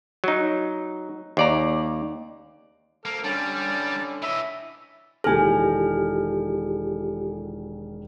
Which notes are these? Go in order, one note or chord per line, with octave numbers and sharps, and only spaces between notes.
F#3 D#4
D#2 D5 A#5
A#3 A4 F6
D3 G3 C#4 A5
E3 D#5 E5
E1 D#3 E4 F4 G4 A4 G#5 F6